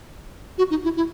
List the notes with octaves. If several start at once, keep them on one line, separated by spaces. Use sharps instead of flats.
F#4
D#4
E4
E4